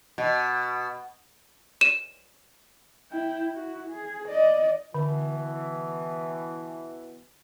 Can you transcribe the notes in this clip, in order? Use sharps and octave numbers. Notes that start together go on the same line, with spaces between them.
B2
D#7 E7
E4 G5
E4 F#4
G#4
D5 D#5
B2 D3 E3